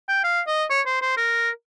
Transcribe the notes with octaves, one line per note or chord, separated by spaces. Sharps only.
G5
F5
D#5
C#5
C5
C5
A#4